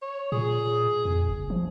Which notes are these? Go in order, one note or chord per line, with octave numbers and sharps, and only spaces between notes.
C#5
A#2 G#4
F2
F#1
F3